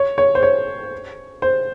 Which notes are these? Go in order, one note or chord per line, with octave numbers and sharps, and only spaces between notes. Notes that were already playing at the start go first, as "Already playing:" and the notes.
Already playing: C#5
C#5
C5
C#5
C5